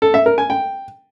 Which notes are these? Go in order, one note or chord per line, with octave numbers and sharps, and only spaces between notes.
A4
E5
A#4
G#5
G5